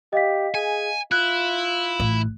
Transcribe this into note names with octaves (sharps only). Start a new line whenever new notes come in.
G4 D#5 F5 B6
G#4 G#5
E4 F4 F#6
A1